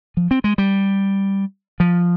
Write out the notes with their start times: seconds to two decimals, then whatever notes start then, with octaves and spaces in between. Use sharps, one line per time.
0.17 F3
0.31 C4
0.44 G#3
0.58 G3
1.80 F3